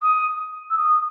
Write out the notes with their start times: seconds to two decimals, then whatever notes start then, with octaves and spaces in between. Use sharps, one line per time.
0.02 D#6
0.69 E6
0.77 D#6